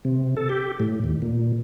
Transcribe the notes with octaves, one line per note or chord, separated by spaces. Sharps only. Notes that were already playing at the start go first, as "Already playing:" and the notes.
C3
A4
G4
A2
D#2
A#2